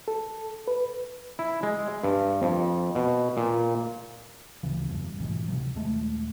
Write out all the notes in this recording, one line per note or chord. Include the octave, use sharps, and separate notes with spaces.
A4
B4
E4
G#3
G2
F2
B2
A#2
A1 D2 C#3 E3
E2 G2
A#1 G#2 B2 E3
D1 C3 F#3
D#1 D#2 G#3 A3